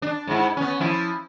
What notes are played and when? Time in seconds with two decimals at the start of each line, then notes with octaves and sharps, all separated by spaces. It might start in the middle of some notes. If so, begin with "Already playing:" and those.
0.02 D4
0.27 G#2 E4
0.57 B3 C#4
0.79 F3 E4